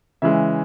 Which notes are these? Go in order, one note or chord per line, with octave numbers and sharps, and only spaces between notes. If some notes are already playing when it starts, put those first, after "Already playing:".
C#3 E3 G#3 E5